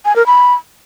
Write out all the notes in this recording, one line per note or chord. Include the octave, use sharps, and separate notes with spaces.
G#5
A#4
B5